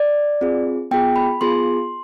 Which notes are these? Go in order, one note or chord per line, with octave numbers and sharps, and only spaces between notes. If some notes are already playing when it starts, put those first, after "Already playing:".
Already playing: D5
C4 F4 G#4
B3 F4 G#4 G5
B5
B3 F4 G#4 C6